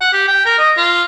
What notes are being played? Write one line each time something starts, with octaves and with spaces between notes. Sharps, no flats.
F#5
G4
G5
A#4
D#5
F4